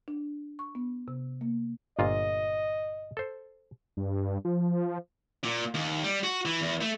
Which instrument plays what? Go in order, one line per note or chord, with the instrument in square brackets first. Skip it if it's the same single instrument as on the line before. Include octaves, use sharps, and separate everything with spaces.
[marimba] D4
C#6
B3
C3
A#3
[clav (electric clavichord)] G1 A#2 F4 [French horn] D#5
[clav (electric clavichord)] A4 C5
[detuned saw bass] G2
F3
[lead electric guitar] A#2
D#2
G3
F#4
E3
E2
A3